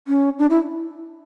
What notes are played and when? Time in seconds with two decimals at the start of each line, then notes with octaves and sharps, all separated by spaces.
0.08 C#4
0.39 D4
0.50 E4